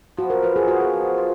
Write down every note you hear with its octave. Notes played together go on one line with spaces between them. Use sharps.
F3 B3 F#4
A#4
F3 B4
G#4
B3 F4 F#4
G#4
F3
F4